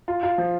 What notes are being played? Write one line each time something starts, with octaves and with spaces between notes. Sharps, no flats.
F4
F4
F3